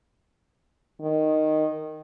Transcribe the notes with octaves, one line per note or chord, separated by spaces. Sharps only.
D#3